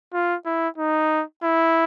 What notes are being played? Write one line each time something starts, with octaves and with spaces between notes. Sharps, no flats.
F4
E4
D#4
E4